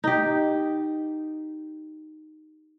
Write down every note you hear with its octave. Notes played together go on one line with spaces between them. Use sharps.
D#4 G4